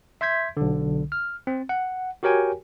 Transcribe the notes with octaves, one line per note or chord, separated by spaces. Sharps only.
E5 C6 G6 G#6 B6
B1 D3
F6
C4
F#5
F#4 G4 A#4 C#5 G5 G#5